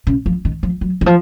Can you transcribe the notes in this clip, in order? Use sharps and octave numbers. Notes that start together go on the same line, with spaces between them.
C#3
F3
D#3
F3
F#3
D#3
F3